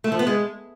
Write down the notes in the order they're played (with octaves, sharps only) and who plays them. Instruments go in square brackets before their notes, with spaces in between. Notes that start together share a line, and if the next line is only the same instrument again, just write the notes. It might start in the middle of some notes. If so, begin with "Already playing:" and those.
[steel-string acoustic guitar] A3
F3
B3
G#3